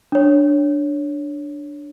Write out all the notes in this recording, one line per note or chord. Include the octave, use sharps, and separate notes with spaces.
D4 C#5